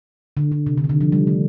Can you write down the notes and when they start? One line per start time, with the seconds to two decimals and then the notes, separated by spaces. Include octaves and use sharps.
0.37 D3
0.52 D3
0.67 C3
0.78 D3
0.84 D#3
0.89 D3
1.01 F3
1.12 G3
1.27 A3